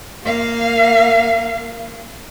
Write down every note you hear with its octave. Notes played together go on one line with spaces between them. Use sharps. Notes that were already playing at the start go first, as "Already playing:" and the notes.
A#3 F5